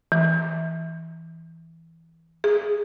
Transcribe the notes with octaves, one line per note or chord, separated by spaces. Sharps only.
E3
G#4